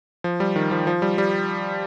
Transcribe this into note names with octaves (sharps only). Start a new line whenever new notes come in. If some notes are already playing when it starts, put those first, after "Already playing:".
F3
G3
D#3
F3
F3
G3
G3